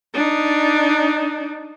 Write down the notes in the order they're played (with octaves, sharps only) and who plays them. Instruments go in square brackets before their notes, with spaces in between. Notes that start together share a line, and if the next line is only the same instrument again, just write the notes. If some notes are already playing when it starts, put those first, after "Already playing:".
[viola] D4 D#4